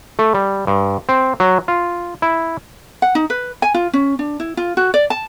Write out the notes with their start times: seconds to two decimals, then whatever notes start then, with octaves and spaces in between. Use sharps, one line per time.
0.19 A3
0.35 G3
0.67 G2
1.09 C4
1.40 F#3
1.68 F4
2.22 E4
3.02 F#5
3.15 D#4
3.30 B4
3.62 G#5
3.74 F4
3.93 C#4
4.19 D4
4.40 E4
4.57 F4
4.77 F#4
4.94 D5
5.10 A5